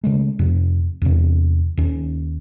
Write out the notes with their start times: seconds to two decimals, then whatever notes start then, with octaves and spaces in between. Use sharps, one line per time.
0.04 C#3 G#3 A3
0.39 F2 C3
1.02 E2 C3
1.77 D#2 C#4